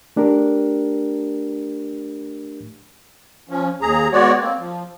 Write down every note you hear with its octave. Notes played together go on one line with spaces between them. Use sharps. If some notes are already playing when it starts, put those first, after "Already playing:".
A3 D4 G4 A#4
F3 C#4
D#2 G#4 A#5
G#3 B3 F#4 C#5 D5
A#3 C4
F3